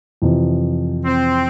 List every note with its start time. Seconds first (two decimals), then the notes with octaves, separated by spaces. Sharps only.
0.22 F2 C3 E3
1.05 C4